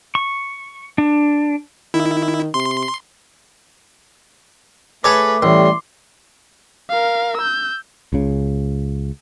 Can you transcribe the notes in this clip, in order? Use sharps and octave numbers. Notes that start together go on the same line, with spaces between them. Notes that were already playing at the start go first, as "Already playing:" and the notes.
C#6
D4
D#3 E4
C3 C6
A3 G#4 A4 B4 C#5 D6
A1 G3 A3 C6
A#4 F5
E6 G6
C#2 C#3